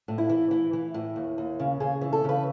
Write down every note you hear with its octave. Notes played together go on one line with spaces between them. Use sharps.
A2
E4
E3
E3
E3
A2
D#2
D#2
C#3
C#3 G#4
E3
A4
C#3 B4